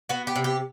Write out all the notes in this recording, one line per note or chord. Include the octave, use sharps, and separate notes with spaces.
B3 F#4
G4
C3
G4